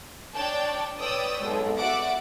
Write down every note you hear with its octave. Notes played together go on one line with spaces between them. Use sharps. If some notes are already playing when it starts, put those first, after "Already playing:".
D4 C#5 D5 G5 A5
B4 C#5 D5 G5 D#6 E6
B1 G#3 A4
F#4 B4 D5 E5 F#5 D6